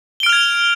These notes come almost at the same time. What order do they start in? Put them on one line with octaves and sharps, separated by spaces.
G7 D7 F6 F7 G#6